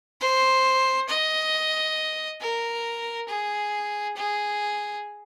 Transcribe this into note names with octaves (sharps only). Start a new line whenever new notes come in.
C5
D#5
A#4
G#4
G#4